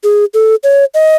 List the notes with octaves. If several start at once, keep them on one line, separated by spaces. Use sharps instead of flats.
G#4
A4
C#5
D#5